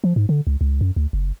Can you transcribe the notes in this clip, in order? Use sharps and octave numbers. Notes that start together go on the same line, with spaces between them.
F3
G#2
D3
C#2
C#2
F#2
D2
F#1